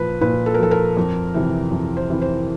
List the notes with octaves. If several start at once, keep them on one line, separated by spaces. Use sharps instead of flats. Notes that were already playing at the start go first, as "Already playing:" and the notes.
Already playing: A#2 F3 B4
A#2 B4
A4
A#4
F3 A4
A#4
F2
C3 E3
F2
C5
C3 E3
C5